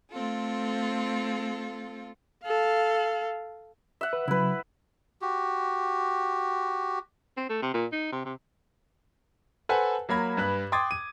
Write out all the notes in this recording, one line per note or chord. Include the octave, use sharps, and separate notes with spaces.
A3 C4 F4 A4
A4 F5
E5 F#5
B4
C#3 F#3 E4 B4
F#4 G4
C4
A3
C3
A#2
D#4
C3
C3
A4 B4 C5 F#5 G#5 A5
F#3 A#3 B5 G#6
G2 B4 F#6
G5 C6 D6 D#6 G#6 A6
D#7